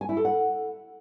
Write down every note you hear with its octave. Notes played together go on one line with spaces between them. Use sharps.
G#5
E4
A4
F#5